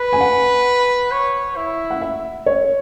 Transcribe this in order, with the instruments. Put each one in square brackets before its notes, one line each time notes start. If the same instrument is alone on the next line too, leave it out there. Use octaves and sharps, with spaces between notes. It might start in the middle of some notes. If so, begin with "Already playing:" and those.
Already playing: [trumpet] B4
[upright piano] G#5
F#5
[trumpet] C#5
E4
[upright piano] F#5
E5
C#5